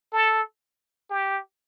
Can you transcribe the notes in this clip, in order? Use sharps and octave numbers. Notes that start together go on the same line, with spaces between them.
A4
G4